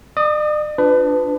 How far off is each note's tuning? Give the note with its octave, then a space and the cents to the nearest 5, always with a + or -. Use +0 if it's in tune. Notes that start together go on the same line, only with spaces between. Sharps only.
D5 +45 D#6 +0
D4 +0 F4 +0 B4 +25